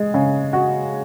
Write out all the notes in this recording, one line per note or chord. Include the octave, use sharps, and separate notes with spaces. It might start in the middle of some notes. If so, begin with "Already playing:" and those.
Already playing: G#3 D#5
C#3
F#4